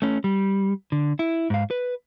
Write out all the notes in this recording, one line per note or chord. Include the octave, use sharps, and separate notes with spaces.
A3 C#4
G3
D3
E4
G#2 F5
B4